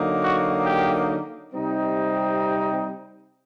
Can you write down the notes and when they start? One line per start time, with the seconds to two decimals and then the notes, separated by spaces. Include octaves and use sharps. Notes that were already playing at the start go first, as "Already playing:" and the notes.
Already playing: D3 F#3 A#3 D#4
0.23 F#4
0.65 G4
1.53 C3 G3 C4 D#4